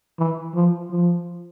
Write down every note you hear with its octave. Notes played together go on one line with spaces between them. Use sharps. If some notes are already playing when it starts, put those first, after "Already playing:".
E3
F3
F3